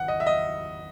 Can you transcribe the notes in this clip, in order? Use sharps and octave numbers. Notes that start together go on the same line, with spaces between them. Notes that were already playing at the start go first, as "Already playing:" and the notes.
Already playing: G#1 F#5
D#5
E5
D#5